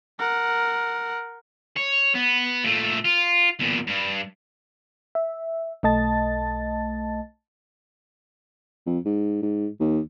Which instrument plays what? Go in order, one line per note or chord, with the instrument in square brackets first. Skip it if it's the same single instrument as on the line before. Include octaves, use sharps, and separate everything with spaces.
[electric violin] A#4 F#5
[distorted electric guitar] C#5
B3
A#2 A3
F4
E2 A#2
G2
[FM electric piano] E5
B1 A3 D#5 A5 A6
[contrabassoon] F2
G#2
G#2
D#2